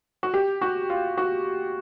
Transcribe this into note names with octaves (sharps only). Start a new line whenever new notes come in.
F#4
G4
F#4
F4
F#4